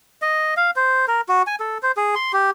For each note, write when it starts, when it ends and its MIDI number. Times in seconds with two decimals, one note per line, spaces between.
0.22 0.54 75
0.57 0.71 77
0.76 1.06 72
1.08 1.21 70
1.29 1.42 66
1.47 1.55 80
1.60 1.78 69
1.83 1.92 72
1.97 2.15 68
2.15 2.32 84
2.33 2.51 67